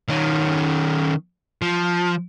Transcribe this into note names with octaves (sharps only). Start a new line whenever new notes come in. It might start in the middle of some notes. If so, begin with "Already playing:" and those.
D#3 C#4
F3